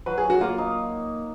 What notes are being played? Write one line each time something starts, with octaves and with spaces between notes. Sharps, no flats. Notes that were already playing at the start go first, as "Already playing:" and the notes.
F#3 B4
G#4
F#3
F#4
A#3 F4
D#4